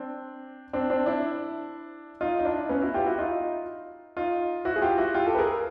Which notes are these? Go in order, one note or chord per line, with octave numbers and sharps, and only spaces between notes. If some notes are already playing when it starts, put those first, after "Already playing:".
Already playing: C4 D4
C4 D4
C4 D4
D4 E4
D#4 F4
D#4
D4 E4
B3 C#4
E4 F#4
F4 G4
E4 F#4
D#4 F4
D#4 F4
E4 F#4
G#4
F4 G4
E4 F#4
F4 G4
G4 A4
B4
G#4 A#4